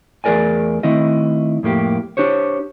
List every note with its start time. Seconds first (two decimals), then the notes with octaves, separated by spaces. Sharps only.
0.24 E2 A3 G#4 A#4 D5 G#5
0.83 D#3 A3 C4 E4 D#5
1.63 F2 A2 A#3 G4
2.17 D4 G4 C5 C#5